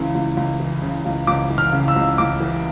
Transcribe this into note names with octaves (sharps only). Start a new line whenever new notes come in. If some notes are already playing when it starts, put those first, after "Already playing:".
Already playing: C#2 C#3 E3
C#2
C#2
E3
C#3
C#2
C#2 D6
E3
F6
C#3
E6
C#2
C#2 D6
E3